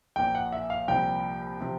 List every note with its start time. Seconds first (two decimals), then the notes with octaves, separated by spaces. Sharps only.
0.16 A#1 A#2 F3 G5
0.35 F#5
0.52 E5
0.70 F5
0.88 C2 A#2 F3 G5
1.61 C3 F3